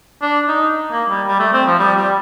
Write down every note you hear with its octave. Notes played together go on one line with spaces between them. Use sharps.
D4
D#4
A#3
G3
G3
A3
C4
F3
G3
G3